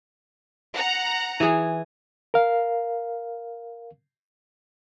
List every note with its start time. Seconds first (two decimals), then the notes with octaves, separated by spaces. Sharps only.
0.75 F#5 A#5
1.40 E3 G#4
2.34 A#4 F5